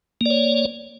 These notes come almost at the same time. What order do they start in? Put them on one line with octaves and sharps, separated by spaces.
A#3 D5 C#5